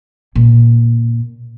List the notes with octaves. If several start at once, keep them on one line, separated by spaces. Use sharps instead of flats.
A#2 C#3